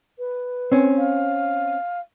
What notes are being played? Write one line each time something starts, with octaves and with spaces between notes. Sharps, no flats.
B4
C4 C#4
F5